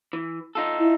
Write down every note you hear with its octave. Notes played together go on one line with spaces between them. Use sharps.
E3
D#4 F4 A4
E4